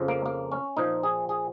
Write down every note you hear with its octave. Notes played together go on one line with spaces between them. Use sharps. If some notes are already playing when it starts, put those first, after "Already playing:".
Already playing: F2 C#3 F3
A#3
A#3
C#4
A#2 F3 D#4
G#4
G#4